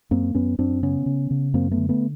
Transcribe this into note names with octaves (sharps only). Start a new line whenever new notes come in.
F#2 A#3 C4
F#2 B3 C#4
F#2 C4 D4
C#3 B3 C#4
C#3
C#3
F#2 A#3 C4
A3 B3
D3
A3 B3